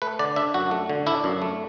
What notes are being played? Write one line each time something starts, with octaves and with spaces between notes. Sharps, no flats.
A3 B4
D3 D5
D4 E5
F#2 F#4
A3
D3
D4 E4
F#2
A3